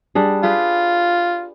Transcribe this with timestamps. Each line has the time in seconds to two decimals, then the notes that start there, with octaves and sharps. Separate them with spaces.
0.15 G3 D4 G#4
0.43 F4 G4 G#4 B4